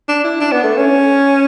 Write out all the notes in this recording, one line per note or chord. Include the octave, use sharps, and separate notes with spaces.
D4
E4
D4
B3
A3
C#4